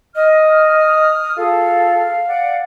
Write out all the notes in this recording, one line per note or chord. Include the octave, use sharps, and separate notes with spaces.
D#5 D#6 F6
F4 G#4 A4 F5
D5 F#5